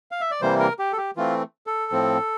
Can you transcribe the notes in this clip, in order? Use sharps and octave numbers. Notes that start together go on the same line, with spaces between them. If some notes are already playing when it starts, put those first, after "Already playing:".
F5
E5
D5
C3 E3 G3 A#3 C5
A#4
G4
A4
G4
E3 A3 C4 F4
A4
A2 F3 C4